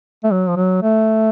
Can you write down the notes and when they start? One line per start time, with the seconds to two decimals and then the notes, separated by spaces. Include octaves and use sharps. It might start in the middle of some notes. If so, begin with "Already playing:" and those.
0.24 A3
0.31 F#3
0.49 F3
0.56 F#3
0.82 A3